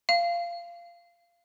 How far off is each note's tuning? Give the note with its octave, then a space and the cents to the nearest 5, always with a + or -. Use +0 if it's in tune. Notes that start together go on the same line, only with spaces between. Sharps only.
F5 -15